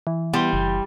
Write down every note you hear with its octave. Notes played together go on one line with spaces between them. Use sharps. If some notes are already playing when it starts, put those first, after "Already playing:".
E3
G3 B3 E4 C6 G7
F#1